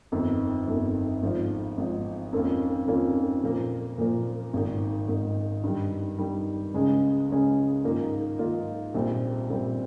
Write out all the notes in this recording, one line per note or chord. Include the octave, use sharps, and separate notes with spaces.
G1 F2 D#3
G1 F2 D#3
G#1 G#2 F3
G#1 G#2 F3
F2 D#3 A#3 C#4 F4
F2 D#3 A#3 C#4 F4
A#2 F3 A#3
A#2 F3 A#3
G#1 G#2 D#3
G#1 G#2 D#3
G2 D#3 G3
G2 D#3 G3
C#2 C#3 G#3 C#4 G#4
C#2 C#3 G#3 C#4 G#4
G#2 D#3 A#3 F4
G#2 D#3 A#3 F4
A#1 A#2 G3 C4
A#1 A#2 G3 C4